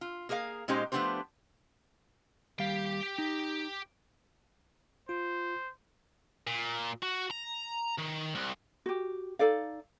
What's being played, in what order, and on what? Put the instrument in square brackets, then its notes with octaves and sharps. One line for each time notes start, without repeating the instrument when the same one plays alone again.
[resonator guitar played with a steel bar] F4
A#3 G#4 A#4 C#5 F5
A#2 G#3 C#4 D#4 G4 C5
F3 A3 B3 D4 G4 C5
[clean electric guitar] D#2 G3 F5 [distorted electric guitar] G4 G5
[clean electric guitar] D#4
[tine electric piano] F4 [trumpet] C5
[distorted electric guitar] A#2
F#4
A#5
D#3
C2
[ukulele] F#4 G4
D#4 A4 D5 F5